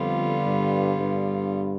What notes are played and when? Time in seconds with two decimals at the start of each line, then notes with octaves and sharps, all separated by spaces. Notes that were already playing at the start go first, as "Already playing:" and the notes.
Already playing: F2 D3 G3 B3 F4
0.46 G2
1.00 G2